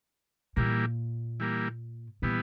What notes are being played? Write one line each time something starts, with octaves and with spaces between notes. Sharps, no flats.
A#2 E3 G3 A#3
E3 G3 A#3
A#2 E3 G3 B3